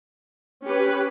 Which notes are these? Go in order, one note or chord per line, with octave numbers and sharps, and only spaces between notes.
C#4 G4 B4